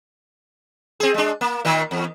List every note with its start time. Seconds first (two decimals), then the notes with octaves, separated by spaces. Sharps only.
1.00 C4 G#4
1.14 G#3 D4
1.41 A#3
1.65 A#2 D#3
1.91 E2